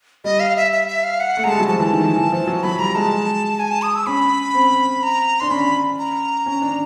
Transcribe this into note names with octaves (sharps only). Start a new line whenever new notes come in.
G3 D#5
F5
E5
E5
E5
F5
F#5
A3
G#3 A#5
G3 A5
F#3
F3 A5
E3
D#3
E3
E3
F3
F#3
F#3 B5
G3 A#5
G#3 A5
G#5
A5
D#6
E6
C#4 B5
C4
A#5
D4 C6
C#4 B5
A#5
C#4
D4